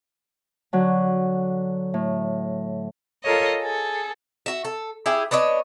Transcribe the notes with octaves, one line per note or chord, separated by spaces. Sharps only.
D3 F#3
A2
F4 A4 A#4 C#5 D#5
G#4 A4
F#4 E5
A4
E4 G4 G#4
B3 D4 C#5 D#5